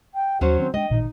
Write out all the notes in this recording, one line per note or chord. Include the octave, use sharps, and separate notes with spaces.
G5
D#2 F#3 C#4 F#4 C5
D#3 C4
G#3 A#3 D4 D#5 G5
A1 A#2 D#3 D#4